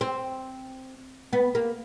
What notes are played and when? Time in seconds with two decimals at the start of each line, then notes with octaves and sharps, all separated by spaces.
0.01 C4
1.33 B3
1.55 A#3